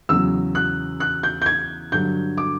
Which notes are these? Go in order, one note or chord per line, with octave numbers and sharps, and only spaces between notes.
E2 C#3 F#3 E6
F#6
F#6
G6
G6
G#6
G2 D3 F#3 G6
D6